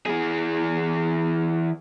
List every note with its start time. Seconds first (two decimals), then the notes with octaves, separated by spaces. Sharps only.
0.06 E3 G#4